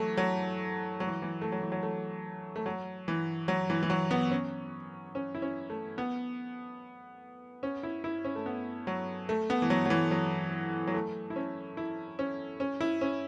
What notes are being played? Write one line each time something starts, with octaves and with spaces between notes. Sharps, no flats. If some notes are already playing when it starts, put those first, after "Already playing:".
Already playing: E3 F#3 A3
F#3
F#3
E3
E3
A3
F#3
E3
F#3
A3
A3
F#3
E3
F#3
E3
E3
F#3
B3
C#4
C#4
E4
C#4
A3
B3
C#4
E4
E4
C#4
A3
B3
F#3
A3
B3
E3
F#3
F#3
E3
F#3
F#3
A3
E4
C#4
E4
C#4
C#4
E4
C#4